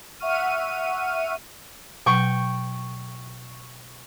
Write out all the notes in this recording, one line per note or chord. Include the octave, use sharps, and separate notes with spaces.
E5 F#5 C#6 F6 D#7
B2 F#3 G5 C#6